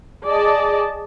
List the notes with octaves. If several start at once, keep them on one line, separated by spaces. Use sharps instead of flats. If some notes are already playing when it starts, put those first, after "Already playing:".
G#4 D5 D#5 A5